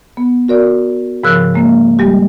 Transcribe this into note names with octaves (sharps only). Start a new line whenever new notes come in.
B3
F#4 A#4 D5
G#2 C#3 F3 A#4 E6 F#6
G#3 A#3
G3 G#3 G4